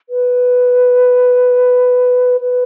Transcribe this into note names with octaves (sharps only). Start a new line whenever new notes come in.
B4
B4